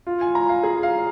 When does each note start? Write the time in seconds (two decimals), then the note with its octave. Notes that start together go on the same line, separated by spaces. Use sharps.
0.07 F4
0.21 G#5
0.35 A#5
0.49 F5
0.63 G#4
0.83 F5